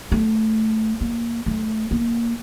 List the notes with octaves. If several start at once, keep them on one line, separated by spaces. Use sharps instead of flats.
A3
A#3
A3
A#3